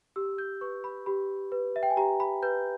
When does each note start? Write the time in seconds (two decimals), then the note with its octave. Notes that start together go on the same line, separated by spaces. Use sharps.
0.16 G4 E6
0.38 G6
0.61 B4 C#6
0.84 B5
1.06 G4 B5
1.52 B4
1.76 E5
1.83 G5
1.90 G#5
1.97 G4 A#5
2.20 B5
2.43 B4 G6